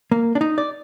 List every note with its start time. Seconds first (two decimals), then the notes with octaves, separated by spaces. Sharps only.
0.11 A#3
0.35 D4
0.41 D#4
0.58 D5